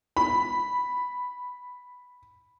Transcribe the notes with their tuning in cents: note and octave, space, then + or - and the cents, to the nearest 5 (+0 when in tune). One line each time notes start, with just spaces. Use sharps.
B5 +0